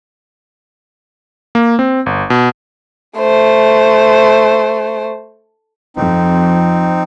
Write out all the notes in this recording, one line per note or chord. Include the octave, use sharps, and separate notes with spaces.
A#3
C4
G1
B2
A3 C5
F2 C4 D#4